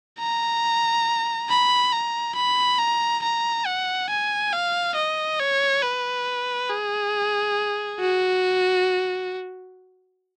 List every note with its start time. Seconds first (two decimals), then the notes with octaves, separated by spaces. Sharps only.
0.20 A#5
1.49 B5
1.92 A#5
2.35 B5
2.79 A#5
3.23 A#5
3.66 F#5
4.10 G#5
4.53 F5
4.96 D#5
5.40 C#5
5.82 B4
6.69 G#4
8.00 F#4